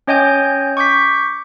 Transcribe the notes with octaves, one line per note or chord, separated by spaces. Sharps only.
C#4 C#5 D#5 G5 G#5 G6
C#6 D6 G6 B6